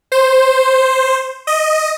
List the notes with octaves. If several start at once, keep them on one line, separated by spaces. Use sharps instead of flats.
C5
D#5